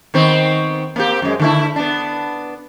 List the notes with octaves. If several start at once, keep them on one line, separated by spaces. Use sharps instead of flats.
D#3 B3 C4
A#3 C4 G4
F#2 G#3
D3 A3 E4
B3 D4